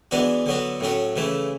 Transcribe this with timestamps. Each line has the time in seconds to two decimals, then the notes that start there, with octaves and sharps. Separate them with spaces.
0.11 E3 G#3 B3 D4 F#4
0.46 D3 F#3 B3 F#4
0.80 A2 F#3 C#4 F#4
1.16 C#3 E3 A3 E4